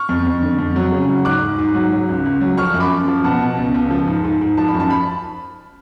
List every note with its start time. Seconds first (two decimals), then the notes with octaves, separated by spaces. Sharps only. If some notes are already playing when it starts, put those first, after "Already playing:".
Already playing: C#6 F6
0.09 F2
0.27 F2
0.42 D3
0.59 F2
0.76 F#3
0.92 C#3
1.09 F#3
1.25 G#2 D6 F#6
1.42 G#2
1.58 G#2
1.75 F#3
1.92 F#3
2.09 C#2
2.26 C#2
2.41 F#3
2.58 F3 C#6 F6
2.74 F#2
2.80 B5 D6
2.91 F#2
3.08 F3
3.24 B2 F#5 A5
3.41 B2
3.57 C#2
3.75 C#2
3.91 F3
4.07 G#2
4.24 G#2
4.41 G#2
4.57 F3 A5
4.68 B5
4.74 F#2
4.80 A5
4.90 B5